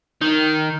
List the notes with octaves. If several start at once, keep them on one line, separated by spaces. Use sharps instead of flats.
D#3